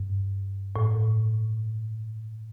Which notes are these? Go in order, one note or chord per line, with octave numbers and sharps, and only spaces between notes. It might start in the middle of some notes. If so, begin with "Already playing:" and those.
Already playing: G2
A2